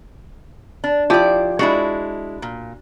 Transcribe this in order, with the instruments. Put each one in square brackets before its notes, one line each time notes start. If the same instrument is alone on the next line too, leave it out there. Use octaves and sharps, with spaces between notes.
[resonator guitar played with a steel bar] D4
[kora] F3 G4 [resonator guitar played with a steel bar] E4 D5
[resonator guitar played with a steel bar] G#3 D4 E4 [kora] F#4
[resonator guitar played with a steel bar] A#2